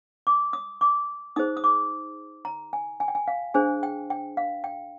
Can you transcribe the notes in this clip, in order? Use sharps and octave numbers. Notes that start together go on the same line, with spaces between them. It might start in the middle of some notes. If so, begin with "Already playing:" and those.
D6
D#6
D6
D#4 G#4 C5 D#6
D#6
D6
A#5
G#5
G#5
G5
G#5
F5
D4 G#4 C5 G#5
G5
G5
F5
G5